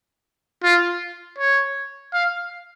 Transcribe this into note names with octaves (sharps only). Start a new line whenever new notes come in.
F4
C#5
F5